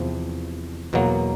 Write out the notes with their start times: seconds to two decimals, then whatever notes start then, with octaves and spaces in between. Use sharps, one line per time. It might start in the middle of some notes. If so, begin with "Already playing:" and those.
Already playing: E2 C3 F3
0.93 E2 B2 F#3 A#3